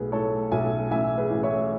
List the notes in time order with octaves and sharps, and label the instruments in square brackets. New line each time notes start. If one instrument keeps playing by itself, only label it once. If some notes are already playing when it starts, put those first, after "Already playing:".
Already playing: [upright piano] B1 A2 G#4 B4
A2 A4 C#5
B1 E5 G#5
A1 E5 G#5
G#4 B4
A1
C#5 E5